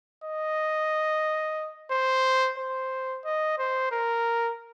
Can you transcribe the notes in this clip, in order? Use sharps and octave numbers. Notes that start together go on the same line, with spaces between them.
D#5
C5
C5
D#5
C5
A#4